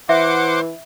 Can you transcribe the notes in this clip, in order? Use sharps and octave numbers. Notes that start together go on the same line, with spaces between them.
E3 C5 E5 F#5 D6